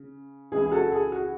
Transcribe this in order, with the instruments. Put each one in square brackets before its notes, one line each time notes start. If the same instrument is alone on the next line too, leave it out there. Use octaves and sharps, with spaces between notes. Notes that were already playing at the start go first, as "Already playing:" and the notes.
Already playing: [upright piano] C#3
C#2 C#3 E3 G#4
G#4
F#4 A4
G#4
F#4